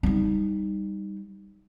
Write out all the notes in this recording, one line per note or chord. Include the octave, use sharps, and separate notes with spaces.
G3 D#4